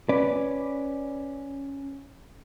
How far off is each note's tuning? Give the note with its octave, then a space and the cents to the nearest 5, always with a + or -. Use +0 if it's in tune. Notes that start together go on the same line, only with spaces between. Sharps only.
C#4 +0 B4 +0 D5 +0